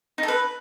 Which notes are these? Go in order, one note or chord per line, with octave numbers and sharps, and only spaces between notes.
D#4
A4
B4